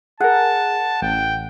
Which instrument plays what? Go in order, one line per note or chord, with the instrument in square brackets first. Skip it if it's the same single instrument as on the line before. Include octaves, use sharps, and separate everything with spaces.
[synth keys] G#4 A#4 [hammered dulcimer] F#5 [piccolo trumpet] A5
[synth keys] A1 [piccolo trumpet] G5